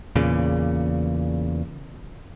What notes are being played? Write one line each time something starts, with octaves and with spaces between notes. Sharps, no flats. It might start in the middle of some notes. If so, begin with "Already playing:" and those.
E2 A#2 C#3